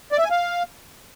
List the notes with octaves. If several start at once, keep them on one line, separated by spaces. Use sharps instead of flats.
D5
E5
G#5
F5